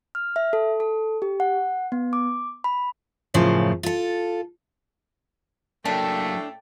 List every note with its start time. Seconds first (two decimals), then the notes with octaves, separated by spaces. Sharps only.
0.15 F6
0.36 E5
0.53 A4
0.80 A4
1.22 G4
1.40 F#5
1.92 B3
2.13 D6
2.64 B5
3.34 F#2 A2 C#3 F3
3.83 F4 A4
5.85 A2 F#3 A3 A#3 D4 G5